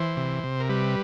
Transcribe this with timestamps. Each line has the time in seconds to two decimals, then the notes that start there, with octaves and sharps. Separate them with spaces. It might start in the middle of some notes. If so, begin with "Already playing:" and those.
Already playing: E3 C5
0.17 C3
0.44 C3
0.60 A#4
0.69 G3 B4